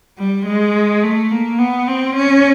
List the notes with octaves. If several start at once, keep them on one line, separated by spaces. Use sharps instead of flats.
G3
G#3
A3
A#3
B3
C4
C#4